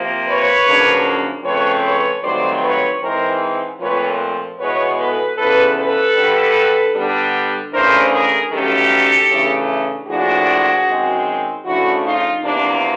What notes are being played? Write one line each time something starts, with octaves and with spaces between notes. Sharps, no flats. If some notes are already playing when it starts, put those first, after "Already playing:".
Already playing: C3 F3 A#3
B4 C#5
F#2 C#3 F3 A#3 D4
C#3 F3 A3 C4 B4 C#5
B4 C#5
G2 D#3 F#3 A3 C4 C5 D5
B4 C#5
G#2 E3 G#3 C4 A#4 C5
A#2 F3 A3 C4 B4 C#5
E2 B2 G#3 B3 B4 C#5
A4 B4
E2 C#3 F3 A4 B4
A4 B4
G2 D3 G3
D3 G3 B3 D4
E2 C#3 E3 A3 D4 A#4 C5
G#4 A#4
G2 D#3 F#3 A3 C#4 G4 A4
C#3 E3 A3 D4
A2 F3 A#3 D4 F#4 G#4
F#2 D#3 G#3 C4
C#3 F3 A3 D4 E4 F#4
D#4 F4
E2 C3 F3 A#3 D4